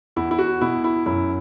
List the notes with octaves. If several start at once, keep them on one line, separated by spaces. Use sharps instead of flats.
E2 E4
E4
F#4
B2 E4
E4
F#2 E4